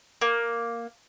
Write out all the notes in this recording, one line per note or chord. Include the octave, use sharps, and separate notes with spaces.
A#3